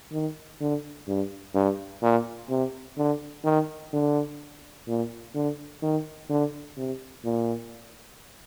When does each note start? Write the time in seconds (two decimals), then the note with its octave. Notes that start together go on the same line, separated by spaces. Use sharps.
0.12 D#3
0.61 D3
1.08 G2
1.55 G2
2.02 A#2
2.49 C3
2.97 D3
3.44 D#3
3.93 D3
4.88 A#2
5.35 D3
5.83 D#3
6.30 D3
6.77 C3
7.25 A#2